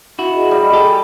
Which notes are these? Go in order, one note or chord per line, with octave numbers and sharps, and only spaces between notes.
E4 F#4
G#4 D#5
G3
G4 A4